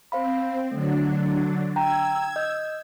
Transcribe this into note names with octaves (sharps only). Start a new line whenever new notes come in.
C4 C5 F5 B5
D3 F#3 A3 D4
G5 A#5 E6 G#6
D#5 G6